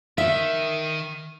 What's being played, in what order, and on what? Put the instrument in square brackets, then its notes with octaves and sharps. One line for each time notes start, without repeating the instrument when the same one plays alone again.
[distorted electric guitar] D#3 [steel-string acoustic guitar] E5